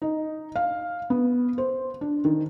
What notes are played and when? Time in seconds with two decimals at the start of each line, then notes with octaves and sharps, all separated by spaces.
0.02 D#4
0.56 F5
1.10 B3
1.58 C5
2.01 D4
2.25 D#3